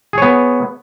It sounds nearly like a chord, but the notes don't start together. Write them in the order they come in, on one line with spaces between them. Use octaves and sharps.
G#4 C#5 B3